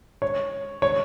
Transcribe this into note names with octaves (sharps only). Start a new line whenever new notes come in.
C#5
C#5